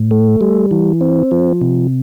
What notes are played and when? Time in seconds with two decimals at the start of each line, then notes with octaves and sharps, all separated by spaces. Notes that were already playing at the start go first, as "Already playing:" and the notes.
Already playing: A2
0.11 A3
0.41 G3
0.71 E3
1.01 C4
1.31 F3
1.61 C3